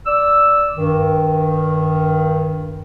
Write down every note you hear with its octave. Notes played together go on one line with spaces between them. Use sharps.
D5 E6
G2 D#3